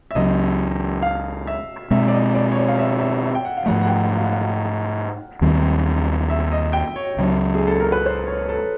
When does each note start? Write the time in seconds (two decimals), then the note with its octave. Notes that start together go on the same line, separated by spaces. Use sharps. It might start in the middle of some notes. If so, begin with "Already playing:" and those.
0.11 E5
0.15 C#2 C#3 F#3 D#5
1.03 F5
1.47 E5
1.91 B2 G#3 C4 E5
2.08 D5
2.13 D#5
2.35 D5
2.51 C#5
2.57 D5
2.68 F5
2.79 E5
3.01 E5
3.23 E5
3.35 G5
3.45 F#5
3.57 F5
3.66 G#2 F3 A3 F#5
3.82 F#5
3.88 G5
4.11 F#5
4.17 F5
4.25 F#5
4.32 F5
5.41 D#2 D#3 G3 C4
6.30 E5
6.52 D#5
6.73 G5
6.96 C#5
7.17 C#2 C#3 F#3
7.55 G#4
7.68 A4
7.80 A#4
7.92 B4
8.06 C5
8.27 C#5
8.49 A4